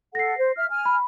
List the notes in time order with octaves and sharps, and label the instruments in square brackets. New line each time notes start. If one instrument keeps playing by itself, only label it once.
[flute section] A4 F#5 [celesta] A#6 C7
[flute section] C5
E5 F6
G#5 F6
[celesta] B5